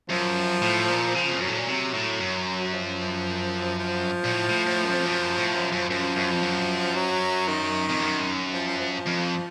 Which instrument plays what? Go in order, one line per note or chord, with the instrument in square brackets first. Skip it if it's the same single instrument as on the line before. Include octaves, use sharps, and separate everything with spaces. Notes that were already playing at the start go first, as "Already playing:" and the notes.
[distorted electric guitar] F#2 [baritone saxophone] F3
[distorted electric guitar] A2
A#2
[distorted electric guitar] C#3 [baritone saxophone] F3
[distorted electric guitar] F2
[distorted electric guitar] F#2 [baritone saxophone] F#3
[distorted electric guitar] A2
A#2
C3
A2
F#2
[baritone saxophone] F3
F3
[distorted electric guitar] A#2
A2
A2
A2
F#2
F2
F#2
A2
F#2
F#2
[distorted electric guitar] F#2 [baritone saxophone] F3
[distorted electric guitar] F#2
F2
F#2
[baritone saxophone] F#3
D#3
[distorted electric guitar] F2
F#2
[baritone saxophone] F3
F3
F3
F3
[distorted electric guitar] F2